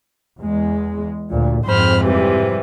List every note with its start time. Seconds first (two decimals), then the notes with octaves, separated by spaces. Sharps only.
0.39 E2 G#3
1.31 D2 A#2
1.66 F2 G#2 C4 C5 B5 F6
2.04 C3 E3 G3